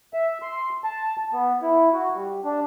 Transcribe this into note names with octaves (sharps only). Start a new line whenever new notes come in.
E5
C6
A5
B3
E4
F#4
G3
D4